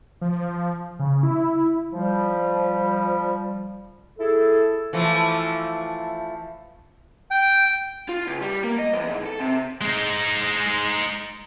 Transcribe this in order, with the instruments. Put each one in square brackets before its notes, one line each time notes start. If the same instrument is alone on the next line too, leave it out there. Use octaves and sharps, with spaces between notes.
[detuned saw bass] F3
C#3
E4
[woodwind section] F3 G3
E4 G#4 A4
[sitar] E3 F3 A3
[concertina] G5
[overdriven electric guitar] F4
C#2
G3
A#3
D#5
E2
G#2
A4
C3
[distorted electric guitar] G#3 D#4